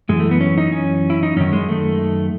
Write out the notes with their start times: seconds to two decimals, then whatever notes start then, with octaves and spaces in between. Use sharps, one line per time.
0.09 F#2 E3 G#3
0.20 A3
0.31 B3
0.41 C#4
0.58 D#4
0.72 C#4
1.10 E4
1.23 D#4
1.37 F#2 D#3 C#4
1.53 G#3
1.69 A3